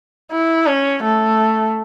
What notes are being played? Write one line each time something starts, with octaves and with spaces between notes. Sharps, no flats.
E4
C#4
A3